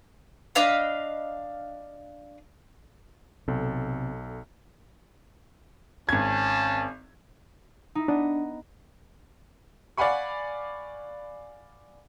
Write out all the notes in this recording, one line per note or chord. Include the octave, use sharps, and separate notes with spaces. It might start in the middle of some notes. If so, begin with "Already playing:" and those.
D4 D#5 F5 B5
B1 C3 A4
G#1 C#4 A5 G#6
D#4 E4
B3 D4 D#5
D5 F5 F#5 G#5 B5 C#6